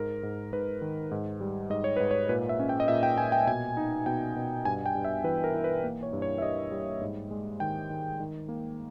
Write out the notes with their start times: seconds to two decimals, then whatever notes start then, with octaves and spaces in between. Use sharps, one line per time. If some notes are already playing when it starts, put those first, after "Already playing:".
Already playing: G#2 A#4
0.23 G#2
0.53 G#2 B4
0.82 D#3
1.11 G#2
1.41 G3
1.70 G#2 D#5
1.84 C#5
1.97 G#2 B4
2.11 C#5
2.29 A#2 B4
2.49 E5
2.59 C#4
2.69 G5
2.80 D#5
2.88 A#2 E5
3.03 G5
3.18 A#2 G#5
3.32 G5
3.47 B2 G#5
3.77 D#4
4.06 B2 G5
4.36 B2
4.65 G2 G#5
4.86 G5
4.95 G2
5.05 E5
5.24 E3 B4
5.44 A#4
5.54 E3
5.64 B4
5.84 A#3
6.03 C#5
6.13 G2
6.22 C#5
6.38 E5
6.42 G2 D#5
6.72 G3
7.01 G#2
7.31 G#3
7.60 D#3 G5
7.90 D#3
8.20 D#3
8.49 A#3